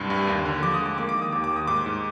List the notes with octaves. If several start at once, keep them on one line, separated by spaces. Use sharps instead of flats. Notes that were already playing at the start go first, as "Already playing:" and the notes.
Already playing: C2 G2
G2
D#2
D3
F3 D6
D#6
G#3
D6
A#3 D6
D6
D#3
D#6
D#2 D6
D6
D#2
D#6
G#2 D6
G#2